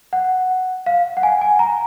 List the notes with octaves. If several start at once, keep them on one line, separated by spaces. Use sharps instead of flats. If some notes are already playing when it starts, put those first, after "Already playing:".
F#5
F5
F#5
G#5
G#5
A#5